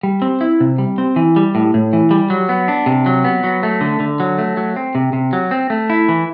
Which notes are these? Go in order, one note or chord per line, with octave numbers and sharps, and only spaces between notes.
G3
C4
E4
C3
G3
C4
E3
G3
A2
A2
E3
G3
F#3
B3
D4
C3
F#3
B3
F#3
A3
D3
D3
F#3
A3
F#3
C4
C3
C3
F#3
C4
A3
E4
E3